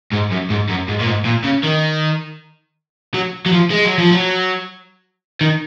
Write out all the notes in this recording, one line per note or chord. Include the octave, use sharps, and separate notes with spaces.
G#2
F#2
G#2
F#2
G#2
A#2
G#2
A#2
C#3
D#3
F#3
F#3
F3
G#3
F#3
F3
F#3
D#3